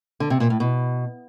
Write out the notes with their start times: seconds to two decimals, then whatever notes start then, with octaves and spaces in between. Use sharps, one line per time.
0.20 D3
0.30 C3
0.40 A#2
0.50 A2
0.60 B2